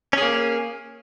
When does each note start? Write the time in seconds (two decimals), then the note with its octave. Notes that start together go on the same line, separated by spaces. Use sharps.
0.13 C#4
0.18 G#4
0.22 A#3